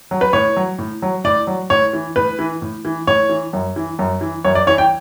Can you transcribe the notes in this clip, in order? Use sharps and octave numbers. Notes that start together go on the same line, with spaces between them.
F#3
B4
A2 C#5
F#3
A2
F#3
A2 D5
F#3
A2 C#5
E3
A2 B4
E3
A2
E3
A2 C#5
E3
F#2
E3
F#2
E3
F#2 C#5
D5
E3 C#5
G5